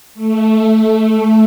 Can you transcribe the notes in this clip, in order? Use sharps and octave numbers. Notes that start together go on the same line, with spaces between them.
A3